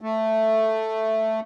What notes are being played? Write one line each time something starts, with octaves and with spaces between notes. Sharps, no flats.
A3